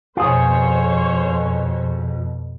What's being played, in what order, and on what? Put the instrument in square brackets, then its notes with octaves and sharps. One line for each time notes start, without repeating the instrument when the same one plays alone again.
[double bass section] F2 B2 [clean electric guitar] F4 G#4 [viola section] C5 C#5